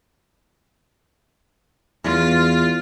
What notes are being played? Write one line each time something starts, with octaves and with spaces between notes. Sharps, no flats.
E2 F4